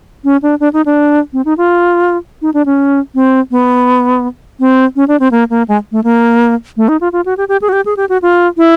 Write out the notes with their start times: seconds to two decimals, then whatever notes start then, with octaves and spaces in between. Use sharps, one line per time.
0.24 C#4
0.42 D4
0.60 D4
0.73 D#4
0.86 D4
1.33 C4
1.45 D#4
1.58 F4
2.42 D#4
2.54 D4
2.66 C#4
3.15 C4
3.51 B3
4.60 C4
4.96 C#4
5.08 D4
5.20 C4
5.31 A#3
5.50 A#3
5.68 G#3
5.92 A3
6.04 A#3
6.77 A3
6.89 D#4
7.01 F4
7.13 F4
7.26 F#4
7.37 G4
7.49 G4
7.62 G#4
7.69 F#4
7.73 G4
7.86 G#4
7.97 G4
8.09 F#4
8.22 F4
8.57 E4